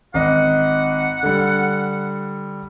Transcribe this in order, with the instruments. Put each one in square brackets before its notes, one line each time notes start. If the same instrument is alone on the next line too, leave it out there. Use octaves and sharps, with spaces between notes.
[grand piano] G#1 D#5 [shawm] F#5
[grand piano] D3 G3